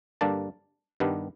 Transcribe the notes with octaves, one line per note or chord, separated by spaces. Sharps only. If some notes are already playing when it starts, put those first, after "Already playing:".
G2 D3 G3 A#3 D4 A5
G2 D#3 G3 B3 D4